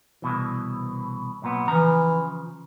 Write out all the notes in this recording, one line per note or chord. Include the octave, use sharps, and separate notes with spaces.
C2 B2 E3
B1 A#2 B3
C#3 E3 F3 A#5